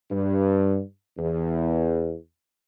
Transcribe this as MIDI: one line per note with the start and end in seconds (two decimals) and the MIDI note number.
0.11 0.80 43
1.18 2.14 40